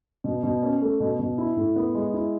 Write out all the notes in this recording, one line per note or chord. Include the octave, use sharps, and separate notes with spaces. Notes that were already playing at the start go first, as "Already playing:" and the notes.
B2
B2
C#4
A3
B2
B2
E4
A2
B3
G#3
E4